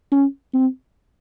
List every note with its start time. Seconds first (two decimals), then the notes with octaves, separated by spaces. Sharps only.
0.12 C#4
0.54 C4